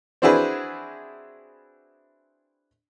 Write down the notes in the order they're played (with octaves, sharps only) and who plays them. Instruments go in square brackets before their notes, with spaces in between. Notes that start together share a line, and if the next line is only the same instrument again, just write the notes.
[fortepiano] C4 D4 E4 F#4 G#4 B4